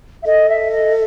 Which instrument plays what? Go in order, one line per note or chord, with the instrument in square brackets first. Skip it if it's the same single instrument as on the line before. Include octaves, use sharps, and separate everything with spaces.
[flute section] E5
[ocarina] A4 [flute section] D#5
[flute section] E5
D#5